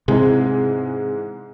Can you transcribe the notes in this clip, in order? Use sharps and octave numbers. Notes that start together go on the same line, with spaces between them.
G#2 C3 E3 G#3